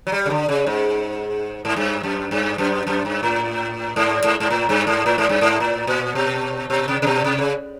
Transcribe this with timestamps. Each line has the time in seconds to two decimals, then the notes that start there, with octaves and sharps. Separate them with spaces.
0.07 F#3
0.12 G3
0.26 C#3
0.30 D3
0.49 C#3
0.67 G#2
1.65 G#2
1.76 G2
2.03 F#2
2.31 G2
2.58 F#2
2.87 F#2
3.05 G2
3.23 A2
3.96 G#2
4.24 G#2
4.40 G#2
4.50 A2
4.69 G2
4.87 G#2
5.06 A2
5.18 G#2
5.29 G2
5.41 G#2
5.60 A2
5.87 A#2
6.15 B2
6.70 B2
6.88 C3
7.02 C3
7.07 B2
7.24 C3
7.39 C#3